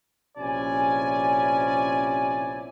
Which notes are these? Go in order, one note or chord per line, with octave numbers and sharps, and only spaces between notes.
A#1 C3 C#4 E4 D5 G#5